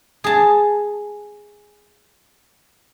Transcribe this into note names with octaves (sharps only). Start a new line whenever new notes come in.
G#4 A5